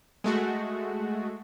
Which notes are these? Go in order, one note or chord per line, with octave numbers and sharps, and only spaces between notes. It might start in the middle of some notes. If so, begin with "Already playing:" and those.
G#3 A3 F#4